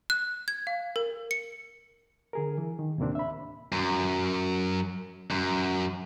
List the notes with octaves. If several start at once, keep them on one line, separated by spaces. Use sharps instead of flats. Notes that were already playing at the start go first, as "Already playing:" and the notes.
F#6
G#6
F5
A#4
C#7
D3 G#4 A#4
E3
D#3
D#2 A2 C3 A#3 C4 D4
E5 B5
F#2
F#2